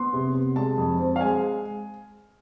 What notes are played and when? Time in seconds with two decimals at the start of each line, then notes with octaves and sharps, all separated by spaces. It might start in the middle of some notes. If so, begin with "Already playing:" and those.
Already playing: B3 C6
0.13 C3
0.35 C3
0.56 G#3 A5
0.78 F2
0.99 C4
1.16 F5
1.21 G#3 G#5